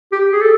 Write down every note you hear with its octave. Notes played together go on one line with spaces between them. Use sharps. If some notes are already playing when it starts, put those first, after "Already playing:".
G4
G#4
A4